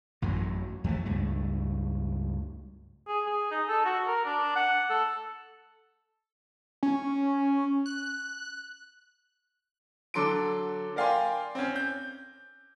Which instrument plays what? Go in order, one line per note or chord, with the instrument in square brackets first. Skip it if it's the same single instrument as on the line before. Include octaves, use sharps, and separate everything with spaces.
[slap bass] A1 F#2 A2 F#3
F2 E3 F3 A3
C#2 G2 A3
[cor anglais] G#4
G#4
D#4
A4
F#4
A#4
D4
F#5
A4
[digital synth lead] C#4
F#6
[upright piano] D3 F#3 A4 C6 D6 D7
A#4 D5 F5 G5 G#5 C6
C4 C#4
G6